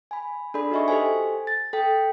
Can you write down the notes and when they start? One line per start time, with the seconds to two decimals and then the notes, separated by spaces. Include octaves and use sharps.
0.11 G#5 B5
0.54 D4 G#4 A4 D5 B5
0.71 D#4 F#4 D#5 E5 G#5 C#6
0.88 G4 A4 C5 G#5
1.47 A6
1.73 A4 G5